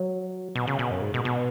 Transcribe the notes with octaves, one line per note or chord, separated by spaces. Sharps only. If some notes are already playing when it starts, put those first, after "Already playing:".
Already playing: F#3
B2
C#3
B2
F#2
G#2
B2
B2